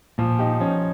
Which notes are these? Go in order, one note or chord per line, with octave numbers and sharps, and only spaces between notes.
A#2 F3
D#4 G4
F3 C#4